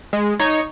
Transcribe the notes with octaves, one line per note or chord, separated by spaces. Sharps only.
G#3
D#4 C#5